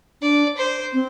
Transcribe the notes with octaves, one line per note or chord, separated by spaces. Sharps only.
D4 D5
C5
C4